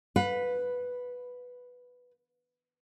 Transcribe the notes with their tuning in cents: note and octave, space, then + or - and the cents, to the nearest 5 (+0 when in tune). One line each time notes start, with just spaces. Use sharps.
B4 +0 F5 +45